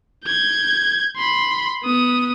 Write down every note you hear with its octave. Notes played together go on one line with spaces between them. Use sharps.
G6 G#6
B5 C6
B3 D#6